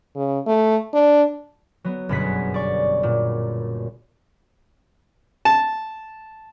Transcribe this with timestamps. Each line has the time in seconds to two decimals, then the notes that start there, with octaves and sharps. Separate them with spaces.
0.16 C#3
0.47 A3
0.93 D4
1.84 F#3 B3
2.09 G1 F#2 B2 G#4 F#5 B6
2.54 D5 C#6
3.03 A#2
5.45 A5